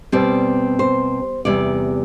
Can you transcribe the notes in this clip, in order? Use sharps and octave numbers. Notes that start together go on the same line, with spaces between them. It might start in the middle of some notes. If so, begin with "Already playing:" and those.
B2 G3 C4 D5
C5
E2 C3 G3 D5